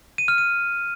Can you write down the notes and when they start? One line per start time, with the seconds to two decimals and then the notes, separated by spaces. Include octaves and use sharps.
0.18 D#7
0.28 F6
0.38 D#7